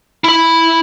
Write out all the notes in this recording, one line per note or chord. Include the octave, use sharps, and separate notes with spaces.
E4 B5